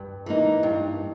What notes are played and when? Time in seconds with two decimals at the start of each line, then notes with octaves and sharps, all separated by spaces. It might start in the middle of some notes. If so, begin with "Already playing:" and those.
Already playing: G2
0.26 E3 A#3 D#4
0.63 G2